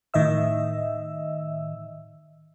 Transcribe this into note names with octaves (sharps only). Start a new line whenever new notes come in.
A2 D#3 D#5 E5 E6